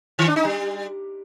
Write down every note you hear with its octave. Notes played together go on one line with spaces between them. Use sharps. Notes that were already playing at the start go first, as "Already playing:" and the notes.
D#3
D4
D#4
G3